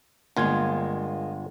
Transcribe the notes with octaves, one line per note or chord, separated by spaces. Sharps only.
G1 G#3 A#3 F4 G#5